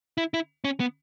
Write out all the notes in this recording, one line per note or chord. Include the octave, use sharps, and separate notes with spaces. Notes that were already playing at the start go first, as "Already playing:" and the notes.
E4
E4
C#4
B3